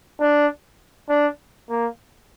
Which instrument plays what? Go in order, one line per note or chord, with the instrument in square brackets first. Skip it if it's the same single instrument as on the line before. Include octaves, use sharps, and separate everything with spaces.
[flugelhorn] D4
D4
A#3